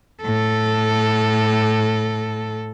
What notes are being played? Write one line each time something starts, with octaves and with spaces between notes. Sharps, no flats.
A2 A4